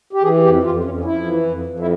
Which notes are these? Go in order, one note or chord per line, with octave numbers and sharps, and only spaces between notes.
G4
E3 G#4
F2 G4
F2 F4
F2 C#4
C#4
F2 E4
E3
F2
F2
E4